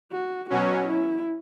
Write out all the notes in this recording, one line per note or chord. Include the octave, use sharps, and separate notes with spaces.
F#4
B2 F#3 C#4 F#4
E4